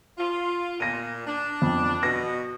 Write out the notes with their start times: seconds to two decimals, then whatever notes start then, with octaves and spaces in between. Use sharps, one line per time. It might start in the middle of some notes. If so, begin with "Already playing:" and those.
0.18 F4
0.80 A#2 A#6 D#7
1.27 D4
1.62 F2
2.03 B2 A#6